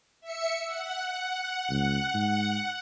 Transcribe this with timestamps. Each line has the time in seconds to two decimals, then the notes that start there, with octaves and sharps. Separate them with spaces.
0.20 E5 C#7
0.66 F#5
1.69 C#2
2.14 G#2